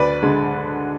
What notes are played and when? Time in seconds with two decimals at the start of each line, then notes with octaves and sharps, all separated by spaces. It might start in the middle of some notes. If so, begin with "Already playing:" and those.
Already playing: D2 B4 D5
0.23 D3 G#3